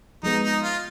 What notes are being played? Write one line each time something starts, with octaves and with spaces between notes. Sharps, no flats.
F3 G#3 B3 D#4
D#4
F4